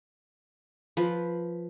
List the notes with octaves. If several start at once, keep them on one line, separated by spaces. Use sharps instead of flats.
F3 B4